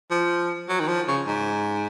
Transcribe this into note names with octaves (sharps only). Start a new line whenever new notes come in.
F3
F#3
D#3
F3
C#3
G#2